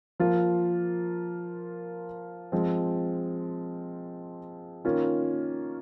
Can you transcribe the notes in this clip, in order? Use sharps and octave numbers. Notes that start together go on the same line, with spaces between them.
F3 A#3 F4
F3 G#3 C4
D#3 A#3 C#4 F4